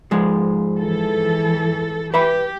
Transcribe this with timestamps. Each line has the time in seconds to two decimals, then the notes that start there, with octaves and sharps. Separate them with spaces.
0.11 G#2 F3 G#3
0.79 E3 A4
2.14 G4 B4 E5 B5